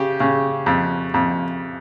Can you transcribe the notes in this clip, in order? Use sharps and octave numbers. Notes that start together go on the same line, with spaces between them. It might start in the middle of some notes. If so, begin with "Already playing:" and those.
Already playing: C#3 G4
C#3
F2
F2